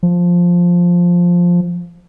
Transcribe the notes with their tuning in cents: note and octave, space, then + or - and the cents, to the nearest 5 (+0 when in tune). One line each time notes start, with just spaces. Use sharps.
F3 +5